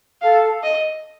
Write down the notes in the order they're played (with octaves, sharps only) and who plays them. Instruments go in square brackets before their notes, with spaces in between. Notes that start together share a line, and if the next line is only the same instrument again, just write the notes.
[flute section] A4 [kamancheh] F5
[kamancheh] D#5